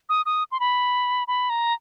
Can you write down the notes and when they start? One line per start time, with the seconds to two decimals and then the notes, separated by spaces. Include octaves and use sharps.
0.09 D#6
0.26 D#6
0.52 C6
0.60 B5
1.28 B5
1.50 A#5